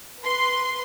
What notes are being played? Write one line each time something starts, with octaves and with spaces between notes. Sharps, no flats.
B4 C6